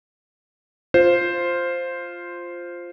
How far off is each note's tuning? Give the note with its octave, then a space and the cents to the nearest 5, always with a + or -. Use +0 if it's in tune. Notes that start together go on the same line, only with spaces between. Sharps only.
F4 +0 C5 +0